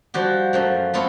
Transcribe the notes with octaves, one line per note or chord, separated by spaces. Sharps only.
F3 G3 F#4 G4
F#2 F3 A3
A3 B3 C4 F4 A4 C#5